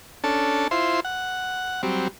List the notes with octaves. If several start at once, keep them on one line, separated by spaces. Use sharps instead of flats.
C#4 D4 A4 A5
E4 F4 C5 C6
F#5
F#3 G3 C4